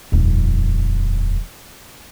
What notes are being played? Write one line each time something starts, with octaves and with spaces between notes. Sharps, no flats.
D#1 F2